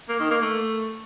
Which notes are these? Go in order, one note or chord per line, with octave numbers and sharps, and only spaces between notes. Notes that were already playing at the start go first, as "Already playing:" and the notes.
A#3
D#3
A#3
A3